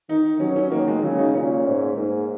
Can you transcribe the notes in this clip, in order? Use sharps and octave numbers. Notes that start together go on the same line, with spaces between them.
D#3 D#4
F#3 C#4
C#4
D#3 A#3
G#3
C#3 F#3
D#4
A#2 C#4
G#2
G#2 A#3